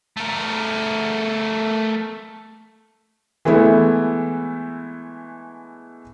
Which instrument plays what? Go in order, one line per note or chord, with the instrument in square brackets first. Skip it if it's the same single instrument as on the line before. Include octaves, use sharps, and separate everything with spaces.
[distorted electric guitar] A3 A#4
[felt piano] E3 G#3 A3 B3 E4